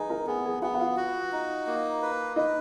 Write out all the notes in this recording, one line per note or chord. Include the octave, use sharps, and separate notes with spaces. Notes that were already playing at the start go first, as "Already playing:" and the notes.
Already playing: D#4 G#4 B4 G#5
A#4 A#5
B3 G#4 G#5
G#4 G#5
B3 F#4 F#5
F#5
F4 F5
F#4
D#4
A#3
B4
D#4 B4 D#5